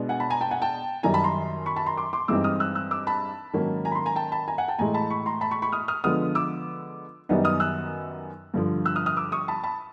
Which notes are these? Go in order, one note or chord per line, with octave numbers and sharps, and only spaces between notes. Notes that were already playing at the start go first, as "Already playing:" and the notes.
Already playing: B2 G#3 B3 D4
F#5 G#5
A5 B5
G#5 A#5
G5 A5
F#5 G#5
G5 A5
F#2 D#3 G3 G#5 A#5
A5 B5
A#5 C6
B5 C#6
A5 B5
A#5 C6
C6 D6
C6 D6
G2 E3 G#3 C4 D#4 D6 E6
D#6 F6
E6 F#6
E6 F#6
D6 E6
A5 B5
G#2 D#3 F#3 A#3 C#4
G#5 A#5
B5
A#5 C6
G#5 A#5
G5 A5
A5 B5
G#5 A#5
F#5 G#5
G5 A5
A2 E3 G#3 G#5 A#5
A5 B5
B5 C#6
A#5 C6
A5 B5
B5 C#6
B5 C#6
D#6 F6
D#6 F6
D3 F3 G#3 B3 D#6 F6
D6 E6
F#2 D#3 G3 B3 D#4
D#6 F6
E6 F#6
G2 D3 F3
E6 F#6
D#6 F6
D#6 F6
D6 E6
C#6 D#6
A5 B5
A5 B5